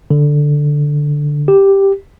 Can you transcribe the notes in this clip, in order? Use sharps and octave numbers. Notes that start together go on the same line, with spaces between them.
D3
G4